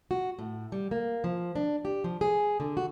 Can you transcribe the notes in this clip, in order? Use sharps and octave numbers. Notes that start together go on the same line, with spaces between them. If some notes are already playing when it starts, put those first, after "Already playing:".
F#4
A2
G3
A#3
F3
D4
G4
F3
G#4
D3
F#4